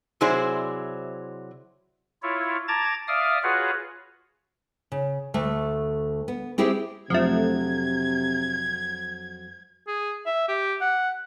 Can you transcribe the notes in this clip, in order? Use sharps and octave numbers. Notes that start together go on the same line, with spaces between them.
C3 F#3 E4 G#4 C5 D5
E4 F4 C#5
A5 A#5 D6 G#6 A6
D5 E5 F5 D6 D#6 F6
F4 F#4 G#4 B4 C#5 F#5
C#3
D2 A3
B3
C4 E4 G4 G#4 C5
F2 C3 F3 F#3 A3 D4 G#6
G#4
E5
G4
F#5